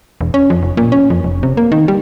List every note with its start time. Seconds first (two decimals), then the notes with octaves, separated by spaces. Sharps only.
0.21 E1
0.34 C#4
0.50 F2
0.63 F1
0.77 A#2
0.92 C#4
1.10 F2
1.24 F1
1.43 C3
1.57 A#3
1.72 D#3
1.88 G3